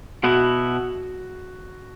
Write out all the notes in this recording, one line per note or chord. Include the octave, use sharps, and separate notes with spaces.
B2 B3 E4 F#4